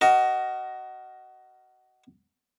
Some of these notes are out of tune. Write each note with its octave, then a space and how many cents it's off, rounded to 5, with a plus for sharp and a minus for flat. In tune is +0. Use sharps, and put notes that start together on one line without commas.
F#4 +20 A#4 +0 D#5 +0